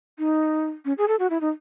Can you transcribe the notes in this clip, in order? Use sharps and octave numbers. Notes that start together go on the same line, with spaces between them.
D#4
C#4
G#4
A4
F#4
E4
D#4